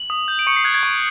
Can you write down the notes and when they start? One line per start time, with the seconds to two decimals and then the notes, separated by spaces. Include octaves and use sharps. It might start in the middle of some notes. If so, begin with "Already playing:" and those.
Already playing: F#7
0.10 D#6
0.28 G6
0.39 D7
0.47 C#6 C#7
0.56 C7
0.64 F#6 G#6
0.74 G#6
0.83 C#6